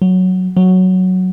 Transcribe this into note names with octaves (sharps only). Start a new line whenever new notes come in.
F#3
F#3